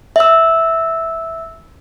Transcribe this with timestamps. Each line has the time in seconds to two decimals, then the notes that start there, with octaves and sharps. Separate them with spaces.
0.16 E5 E6